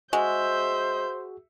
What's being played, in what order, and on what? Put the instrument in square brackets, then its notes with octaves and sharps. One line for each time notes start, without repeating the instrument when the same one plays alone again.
[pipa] G#3 [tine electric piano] F#4 G#4 [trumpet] C5 [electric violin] E5 G6